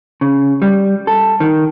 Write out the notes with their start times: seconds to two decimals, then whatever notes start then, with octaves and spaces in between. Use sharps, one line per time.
0.21 C#3
0.62 G3
1.07 A4
1.40 D#3